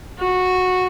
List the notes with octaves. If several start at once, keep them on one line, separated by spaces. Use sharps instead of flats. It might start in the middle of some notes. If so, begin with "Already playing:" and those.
F#4